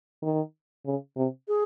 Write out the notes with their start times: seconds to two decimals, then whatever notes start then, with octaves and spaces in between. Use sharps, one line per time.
0.22 D#3
0.86 C#3
1.17 C3
1.48 G#4